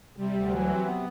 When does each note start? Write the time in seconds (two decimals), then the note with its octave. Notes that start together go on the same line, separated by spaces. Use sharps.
0.16 C3 G3
0.34 D2
0.51 E3 F#3
0.67 C3
0.85 B3